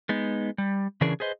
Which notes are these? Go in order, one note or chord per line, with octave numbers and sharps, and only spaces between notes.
G#3 B3 D#4
G3
C#3 E3 C#4 D4 G#4 A#4
G#4 B4 C5 D#5